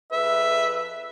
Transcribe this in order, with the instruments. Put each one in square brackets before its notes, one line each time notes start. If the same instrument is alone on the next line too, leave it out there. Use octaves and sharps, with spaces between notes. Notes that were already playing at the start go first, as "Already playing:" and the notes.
[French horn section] F2 G#4 B4 [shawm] E5